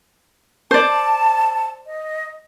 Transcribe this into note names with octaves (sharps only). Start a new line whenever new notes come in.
C5 D5 A5
D#5